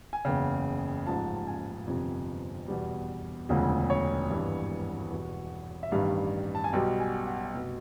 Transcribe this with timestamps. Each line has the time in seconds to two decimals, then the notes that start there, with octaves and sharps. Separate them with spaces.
0.13 G#5
0.25 F#1 E2 C#3 G5
1.07 A1 G#2 F3 A5
1.36 A5
1.47 G#5
1.87 G1 F2 C3
2.68 E2 B2 G3
3.49 E1 D2 C#3 F3
3.90 C#5
4.30 G#1 G2 E3
5.10 E2 B2 G3
5.83 E5
5.92 A1 G2 D#3 G3 F5
6.55 A5
6.64 G#5
6.73 B1 B2 G3 G5
7.00 G#5
7.27 F#5
7.54 F1 B2